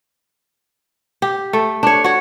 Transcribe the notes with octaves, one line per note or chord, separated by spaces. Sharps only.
G4
A3
D4 C#5
F#4 C#5